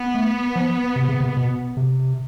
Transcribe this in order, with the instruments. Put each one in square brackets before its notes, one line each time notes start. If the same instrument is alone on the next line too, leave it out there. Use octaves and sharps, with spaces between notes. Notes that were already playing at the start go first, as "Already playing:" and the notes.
Already playing: [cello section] B3
[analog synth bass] A3
F3
C3
C#3
C3
B2
C3